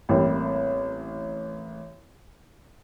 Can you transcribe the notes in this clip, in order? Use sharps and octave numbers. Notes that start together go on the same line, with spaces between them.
A1 G3 A#3 C4 E4 G5